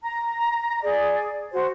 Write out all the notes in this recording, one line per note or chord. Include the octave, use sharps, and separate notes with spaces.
A#5
G#4 D5
F#4 C5